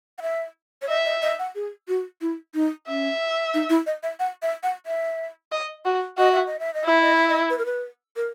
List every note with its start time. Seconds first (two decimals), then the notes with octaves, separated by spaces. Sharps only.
0.18 F#5
0.22 E5
0.82 C#5
0.89 D#5 E5
1.05 D#5
1.22 D#5
1.39 F#5
1.55 G#4
1.88 F#4
2.21 E4
2.54 D#4
2.87 C#4 E5
3.54 D#4
3.70 E4
3.86 D#5
4.03 E5
4.20 F#5
4.42 E5
4.63 F#5
4.86 E5
5.52 D#5
5.86 F#4
6.17 F#4 D#5
6.32 E5
6.46 D#5
6.60 E5
6.74 D#5
6.85 E4 E5
7.02 D#5
7.15 E5
7.29 D#5
7.50 B4
7.58 A#4
7.66 B4
8.16 A#4